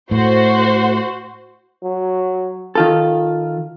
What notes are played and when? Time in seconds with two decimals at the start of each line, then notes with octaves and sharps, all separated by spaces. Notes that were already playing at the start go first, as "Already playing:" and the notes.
0.11 A2 F#4 C5
1.83 F#3
2.75 D#3 F4 A4